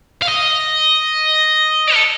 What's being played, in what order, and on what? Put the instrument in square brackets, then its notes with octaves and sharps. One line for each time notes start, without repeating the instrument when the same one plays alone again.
[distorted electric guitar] F5
D#5
A4